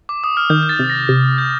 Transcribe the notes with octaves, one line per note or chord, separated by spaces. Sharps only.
D6
D#6
F6
D#3 G6
G6
A6
C3
A#6
C3 A6
G6